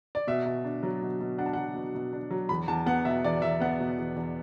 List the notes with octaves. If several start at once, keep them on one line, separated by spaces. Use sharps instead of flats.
D5
B2 E5
B2
D4
F#3
B2
B2
D4 F#5
A5
F#3 F#5
B2
B2
D4
F#3
E2 B5
E2 A5
B3 F#5
B2 E5
E2 D5
E2 E5
B3 F#5
B2
E2
E2